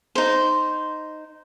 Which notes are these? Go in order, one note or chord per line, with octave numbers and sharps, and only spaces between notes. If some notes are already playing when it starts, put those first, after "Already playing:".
D#4 C5